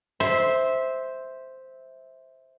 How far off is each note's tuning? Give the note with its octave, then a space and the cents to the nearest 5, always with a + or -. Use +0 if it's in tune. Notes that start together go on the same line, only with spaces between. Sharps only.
C5 +0 E5 -15 C6 -10